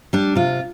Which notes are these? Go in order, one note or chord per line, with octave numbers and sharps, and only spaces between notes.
G3 D4
C3 F4